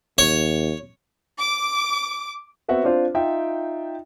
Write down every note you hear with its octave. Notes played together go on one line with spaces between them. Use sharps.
D#2 C#5
D6
B3 C4 F#4 E5 F#5
C4 D4 F4 C5
D#4 F4 E5 G5